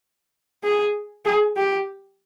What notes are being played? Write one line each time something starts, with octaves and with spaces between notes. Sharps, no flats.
G#4
G#4
G4